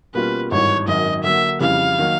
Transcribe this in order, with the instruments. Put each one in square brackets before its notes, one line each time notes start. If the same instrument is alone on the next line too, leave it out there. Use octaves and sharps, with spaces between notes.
[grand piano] B2 G3 A#3 C#4 F4 [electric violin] B4
[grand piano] G#1 G2 E3 [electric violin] C#5
[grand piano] G#1 F#2 D#3 [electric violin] D#5
[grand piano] D3 F#3 A#3 [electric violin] E5
[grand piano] F2 C#3 E3 G3 [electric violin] F5
[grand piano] D#3 F#3 A#3